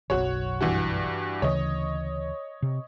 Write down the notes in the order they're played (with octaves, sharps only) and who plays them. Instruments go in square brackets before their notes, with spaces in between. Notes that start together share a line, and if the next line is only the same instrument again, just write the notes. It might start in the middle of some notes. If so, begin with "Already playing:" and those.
[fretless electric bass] F#1 B1 [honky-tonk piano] F#4 C#5
[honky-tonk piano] G2 E3 F#4
[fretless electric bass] D2 C#3 E3 [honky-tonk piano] C#5 D#5
[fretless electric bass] C3